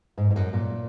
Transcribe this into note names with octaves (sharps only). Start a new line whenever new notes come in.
G#2
G#2
F#2
A#2